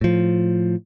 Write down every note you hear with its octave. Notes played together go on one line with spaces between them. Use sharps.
A2 F3